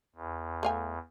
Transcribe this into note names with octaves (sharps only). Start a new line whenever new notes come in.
E2
A3 F5 G#5